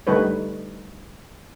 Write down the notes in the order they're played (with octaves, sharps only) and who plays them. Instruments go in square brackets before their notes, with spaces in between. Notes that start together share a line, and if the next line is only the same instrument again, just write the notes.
[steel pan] D3 G3 A3 D#4 B4 C#5